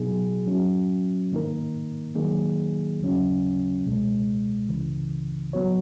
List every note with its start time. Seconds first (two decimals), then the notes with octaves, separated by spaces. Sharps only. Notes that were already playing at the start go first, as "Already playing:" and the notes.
Already playing: B2 F#3 B3 D#4 G#4
0.46 F#3 C#4 F#4
1.31 G#2 D#3 A#3 D#4 A#4
2.15 D#3 F#3 A#3 D#4 G#4
3.00 D#2 C#3 F#3 C#4
3.84 C#2 B2 G#3
4.69 C#2 C#3 E3
5.53 F#3 B3 F#4 C#5